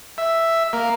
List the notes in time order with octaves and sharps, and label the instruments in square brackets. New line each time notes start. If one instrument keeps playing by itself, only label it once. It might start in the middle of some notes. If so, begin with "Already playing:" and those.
[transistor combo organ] E5
A#3